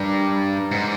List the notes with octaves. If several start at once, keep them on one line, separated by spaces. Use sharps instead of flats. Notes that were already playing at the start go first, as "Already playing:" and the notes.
Already playing: G2 A#4 D5
G#2